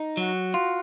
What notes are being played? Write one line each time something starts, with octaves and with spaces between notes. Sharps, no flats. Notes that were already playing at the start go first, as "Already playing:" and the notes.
Already playing: D#4
F#3 F#4
F4